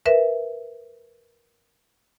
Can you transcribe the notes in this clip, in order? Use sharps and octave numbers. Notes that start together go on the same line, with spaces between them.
A#4 B4 E5